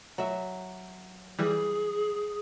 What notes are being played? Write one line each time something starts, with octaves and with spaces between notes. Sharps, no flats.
F#3 E5
E3 G3 G#4